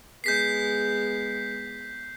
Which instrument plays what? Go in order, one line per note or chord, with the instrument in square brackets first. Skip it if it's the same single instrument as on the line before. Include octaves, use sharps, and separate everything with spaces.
[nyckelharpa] G#3 B3 [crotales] G6 B6 C7